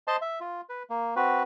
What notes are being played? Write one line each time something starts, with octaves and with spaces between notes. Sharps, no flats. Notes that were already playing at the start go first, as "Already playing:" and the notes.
C5 D#5 A5 C6
E5
F4
B4
A#3
C4 F#4 B4